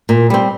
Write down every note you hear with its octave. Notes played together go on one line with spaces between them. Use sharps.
A#2
G3 C4